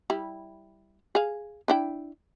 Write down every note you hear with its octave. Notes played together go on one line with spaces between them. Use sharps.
G3 E4
G#4 F5
D4 E4 G5